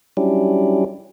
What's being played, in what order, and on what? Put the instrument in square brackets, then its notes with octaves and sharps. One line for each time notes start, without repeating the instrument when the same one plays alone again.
[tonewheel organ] F#3 G3 C#4 D4 E4 G4